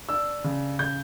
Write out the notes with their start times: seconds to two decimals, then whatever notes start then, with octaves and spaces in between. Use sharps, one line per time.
0.09 D4 E6
0.44 C#3
0.79 C#3 G6